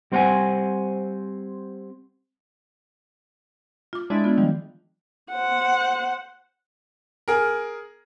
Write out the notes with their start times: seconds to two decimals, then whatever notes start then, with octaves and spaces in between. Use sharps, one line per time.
0.12 G3 C4 C5 F5 F#5 G#5
3.93 F4 D6
4.10 G#3 D4 E4
4.24 B3 F4
4.38 D#3 F3 G3
5.32 C5 F#5
7.28 G#4 A#4